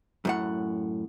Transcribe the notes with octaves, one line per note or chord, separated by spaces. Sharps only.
F#2 A2 F#5